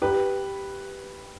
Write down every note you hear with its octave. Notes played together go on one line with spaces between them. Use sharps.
G4 B4